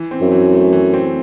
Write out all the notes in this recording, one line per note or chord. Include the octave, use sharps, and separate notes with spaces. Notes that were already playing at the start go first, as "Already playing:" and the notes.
Already playing: E3
C4
F#2
E3
A3
E3
C4